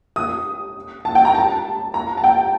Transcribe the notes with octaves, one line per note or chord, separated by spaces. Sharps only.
D#6
A5
G5
A#5
A5
A#5
A5
G5